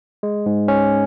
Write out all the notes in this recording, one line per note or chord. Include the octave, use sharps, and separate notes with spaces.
G#3
G#2
C#4